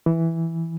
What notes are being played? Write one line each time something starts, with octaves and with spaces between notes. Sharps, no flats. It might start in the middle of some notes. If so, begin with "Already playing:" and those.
E3